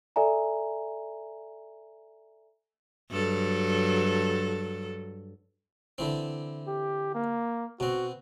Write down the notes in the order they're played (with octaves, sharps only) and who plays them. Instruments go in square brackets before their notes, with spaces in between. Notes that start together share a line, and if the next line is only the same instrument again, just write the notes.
[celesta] A4 D5 E5 G#5 A#5
[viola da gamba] G2 F#3 A4
[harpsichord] D3 E3 C4
[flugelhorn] G4
A#3
[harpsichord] B2 C4 [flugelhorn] F#4